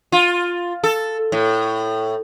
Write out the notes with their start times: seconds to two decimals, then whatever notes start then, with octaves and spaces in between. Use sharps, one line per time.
0.12 F4
0.84 A4
1.32 A2